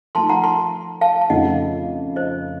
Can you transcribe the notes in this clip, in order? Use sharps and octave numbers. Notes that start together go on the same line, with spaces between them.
F3 A3 D#4 A5 C6
F#5 A#5
A5 C6
F5 A5
A5
F2 C#3 A3 D#4 D#5 F#5
C5 D#5